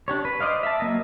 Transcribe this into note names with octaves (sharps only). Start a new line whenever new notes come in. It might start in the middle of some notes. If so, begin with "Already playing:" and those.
D4 G4 C#5
B4
C5 D5 D#5 F5
E5 A5
F#3 A#3 D#5